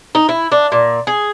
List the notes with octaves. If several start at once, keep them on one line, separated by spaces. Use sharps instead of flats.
D#4
E4
D4
A#2
G#4